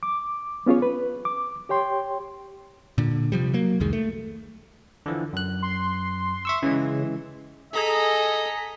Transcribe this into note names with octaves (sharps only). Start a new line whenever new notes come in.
D6
B3 C#4 F4 G#4 C#5
B4
D6
G4 C#5 G5 C6
A#2 D3
C3 F3 G3
F#3 A#3
C2 F2 D#3 G#3
A3
D3 E3 F3
F#2 F#6
C6
E5 C#6 E6
C#3 E3 G#3
G#4 A4 D#5 A#5 B6